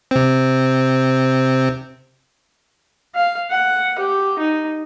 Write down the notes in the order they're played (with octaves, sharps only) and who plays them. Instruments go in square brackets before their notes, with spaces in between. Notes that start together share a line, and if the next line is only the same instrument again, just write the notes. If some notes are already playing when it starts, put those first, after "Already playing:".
[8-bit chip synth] C3 C4
[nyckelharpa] F5
F#5
G4
D#4